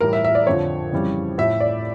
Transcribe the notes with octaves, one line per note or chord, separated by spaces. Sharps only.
A2 E3 G3 A#4
E5
E5
D5
F2 D3 F3 C#5
F2 C#3 E3 G3
A2 F3 E5
D5